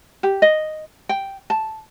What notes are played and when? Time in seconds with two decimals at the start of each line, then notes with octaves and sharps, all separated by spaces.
0.23 G4
0.42 D#5
1.09 G5
1.50 A5